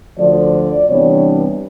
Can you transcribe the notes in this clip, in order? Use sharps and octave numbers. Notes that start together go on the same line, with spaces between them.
D2 D3 F3 D5
C3 E3 G3 B3 D4 C#5